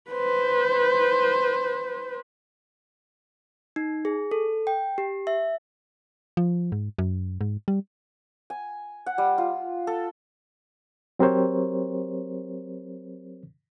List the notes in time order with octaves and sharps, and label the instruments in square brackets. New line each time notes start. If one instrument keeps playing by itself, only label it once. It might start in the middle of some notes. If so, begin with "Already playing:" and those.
[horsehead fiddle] B4 C5
[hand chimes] D#4
G#4
A4
G5
G4
E5
[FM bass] F3
G#2
F#2
G#2
G3
[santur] G#5
F#5
G3
F4
A4
[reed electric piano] F#3 C4 G4 A#4 C5 C#5